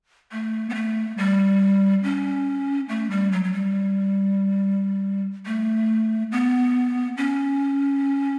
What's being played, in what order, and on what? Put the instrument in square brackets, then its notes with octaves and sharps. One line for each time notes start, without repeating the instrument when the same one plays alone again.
[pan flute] A3
B3
A3
G3
C#4
A3
G3
F#3
F#3
G3
A3
B3
C#4